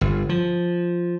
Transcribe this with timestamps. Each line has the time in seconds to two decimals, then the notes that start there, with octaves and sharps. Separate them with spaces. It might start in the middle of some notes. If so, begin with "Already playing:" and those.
0.01 G1
0.29 F3